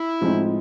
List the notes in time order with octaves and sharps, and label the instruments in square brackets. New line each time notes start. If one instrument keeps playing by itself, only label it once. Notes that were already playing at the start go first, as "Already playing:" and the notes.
Already playing: [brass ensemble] E4
[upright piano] A2 F3 G#3 C4 D#4